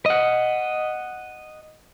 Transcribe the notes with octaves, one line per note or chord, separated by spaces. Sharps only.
D#5 F#5